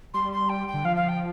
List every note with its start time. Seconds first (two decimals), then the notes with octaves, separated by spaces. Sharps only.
0.14 G3 C6
0.32 C6
0.49 G5
0.67 G5
0.74 D3
0.85 F3 F5
0.96 F5
1.08 G5